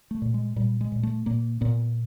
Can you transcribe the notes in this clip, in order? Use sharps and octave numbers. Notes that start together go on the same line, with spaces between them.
A3
A#2
G#3
A#2 G3
G#3
A#2
A3
A#2 A#3
A#2 B3